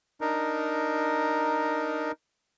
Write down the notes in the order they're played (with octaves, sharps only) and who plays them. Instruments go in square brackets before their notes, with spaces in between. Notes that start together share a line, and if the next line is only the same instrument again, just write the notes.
[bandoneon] D4 D#4 A#4